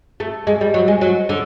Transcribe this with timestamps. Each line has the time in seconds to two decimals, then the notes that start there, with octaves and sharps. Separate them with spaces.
0.20 A3
0.47 G#3
0.61 G3
0.74 F#3
0.88 G#3
1.01 F#3
1.29 D3